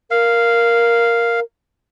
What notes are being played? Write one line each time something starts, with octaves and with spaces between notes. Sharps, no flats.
A#4 F5